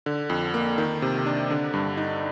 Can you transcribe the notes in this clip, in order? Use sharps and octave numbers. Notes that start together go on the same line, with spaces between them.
D3
F2
A#3
D#3
C3
D4
D3
G2
D#4